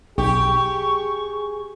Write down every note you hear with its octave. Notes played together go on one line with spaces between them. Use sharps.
B1 G4 G#4 C#6